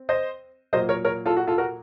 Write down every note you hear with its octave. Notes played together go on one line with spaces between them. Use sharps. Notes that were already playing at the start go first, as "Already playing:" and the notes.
Already playing: C4
C5 D#5
A#2 F#3 A#3 C5 D#5
A#4 C#5
A#4 C#5
F4 A4
F#4
F4 A4
F#4 A#4